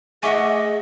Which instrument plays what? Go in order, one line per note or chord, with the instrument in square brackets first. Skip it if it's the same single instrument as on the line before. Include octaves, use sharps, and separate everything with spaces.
[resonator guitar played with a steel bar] A3 E5 F#5 [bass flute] G#4 [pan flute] D#5 [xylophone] G#5 C#6 D6